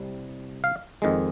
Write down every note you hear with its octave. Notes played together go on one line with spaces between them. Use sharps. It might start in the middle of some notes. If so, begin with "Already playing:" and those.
Already playing: C2 C3 G3
F5
F2 D#3 G#3